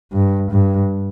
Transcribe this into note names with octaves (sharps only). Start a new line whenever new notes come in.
G2
G2